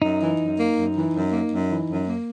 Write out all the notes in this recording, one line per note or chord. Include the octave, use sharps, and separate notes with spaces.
F#2 D#4
E3
F#2
A#3
F#2
E3
F#2
A#3
F#2
E3
F#2
A#3